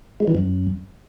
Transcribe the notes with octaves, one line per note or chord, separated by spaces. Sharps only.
G#3
E3
F#2